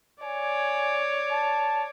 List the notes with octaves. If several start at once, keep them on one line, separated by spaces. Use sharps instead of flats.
C#5 D5 G#5
A5